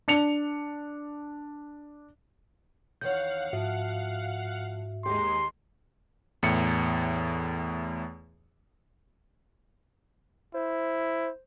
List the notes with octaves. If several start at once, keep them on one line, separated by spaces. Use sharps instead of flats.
D4 C#7 F7
E2 D#3 C#5 F5 F#5 G6
G#2 F3 F#4 E5
D#2 G#3 G4 A#5 C6
E2 A2 C#7
E4 C5